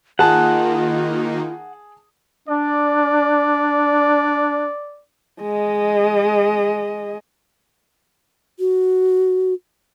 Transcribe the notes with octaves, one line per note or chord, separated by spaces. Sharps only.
D#3 A#3 D#4 F4 G#4 F#5 A5
D4 D5
G#3 D#5
F#4